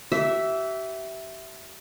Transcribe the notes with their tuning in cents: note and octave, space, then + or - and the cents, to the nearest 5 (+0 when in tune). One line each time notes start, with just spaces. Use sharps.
G4 -40 E5 +0